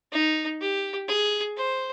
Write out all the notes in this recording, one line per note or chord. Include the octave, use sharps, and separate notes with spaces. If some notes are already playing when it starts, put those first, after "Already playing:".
D#4
G4
G#4
C5